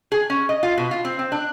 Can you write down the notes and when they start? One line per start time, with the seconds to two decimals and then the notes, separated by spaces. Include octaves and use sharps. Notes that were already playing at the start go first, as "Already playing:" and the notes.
0.12 G#4
0.30 C#4
0.49 D#5
0.63 F4
0.78 B2
0.91 F4
1.05 C4
1.19 C4
1.32 D4